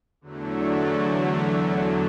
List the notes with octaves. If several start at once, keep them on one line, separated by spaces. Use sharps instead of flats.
E2 D3 F#3 A3